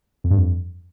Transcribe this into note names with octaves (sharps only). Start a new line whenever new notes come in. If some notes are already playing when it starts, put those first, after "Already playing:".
F2
G2
F2